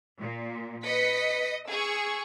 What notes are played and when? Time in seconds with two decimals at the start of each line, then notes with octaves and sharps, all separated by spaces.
0.18 A#2
0.85 B4 D#5 B6 C#7
1.69 G#4 C#6 E6